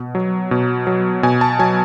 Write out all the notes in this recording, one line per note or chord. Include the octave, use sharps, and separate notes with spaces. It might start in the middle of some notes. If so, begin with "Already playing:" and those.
Already playing: B2
F#3
B2
F#3
B2 G#5
A5
F#3 G#5